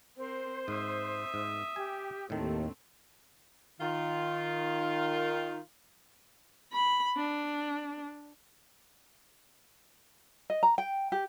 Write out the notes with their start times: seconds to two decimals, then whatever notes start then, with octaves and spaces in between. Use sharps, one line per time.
0.17 C4 A#4 C5
0.68 G#2 E5 D#6
1.34 G#2
1.76 G4 G#5
2.30 D#2 A2 D#3 A3 C4 A4
3.80 D#3 F4
6.73 B5
7.17 D4
10.50 D#5
10.63 A#5
10.78 G5
11.12 G4